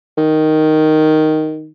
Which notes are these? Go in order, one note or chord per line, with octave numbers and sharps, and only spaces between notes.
D#3